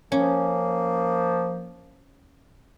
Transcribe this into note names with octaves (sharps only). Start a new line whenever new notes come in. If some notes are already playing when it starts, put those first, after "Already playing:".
F3 A#3 C#4